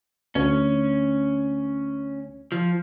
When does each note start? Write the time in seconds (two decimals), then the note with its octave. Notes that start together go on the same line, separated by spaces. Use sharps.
0.35 D2 C#4
2.52 F3